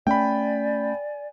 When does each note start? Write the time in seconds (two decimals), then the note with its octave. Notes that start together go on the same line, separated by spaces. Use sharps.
0.07 A3 C#4 D5 G5 G#5 B5